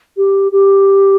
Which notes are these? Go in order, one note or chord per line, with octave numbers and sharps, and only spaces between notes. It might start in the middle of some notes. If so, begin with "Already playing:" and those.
G4
G4